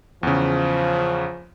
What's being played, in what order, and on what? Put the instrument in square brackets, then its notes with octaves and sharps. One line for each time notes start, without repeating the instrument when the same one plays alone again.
[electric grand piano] E2 C#3 [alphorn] F3